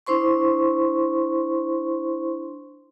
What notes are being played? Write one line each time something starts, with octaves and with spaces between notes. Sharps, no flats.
D4 E4 C5 C6 C#6